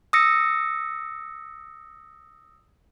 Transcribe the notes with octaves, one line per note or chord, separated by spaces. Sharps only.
D#6 E6 A#6 C#7